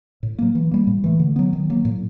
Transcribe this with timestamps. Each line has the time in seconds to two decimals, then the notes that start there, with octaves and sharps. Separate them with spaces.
0.23 A2
0.39 F#3 A#3
0.55 E3
0.71 G3 A#3
0.87 A2
1.04 E3 A3
1.20 D3
1.36 F#3 B3
1.53 D#3
1.70 F#3 A#3
1.85 A2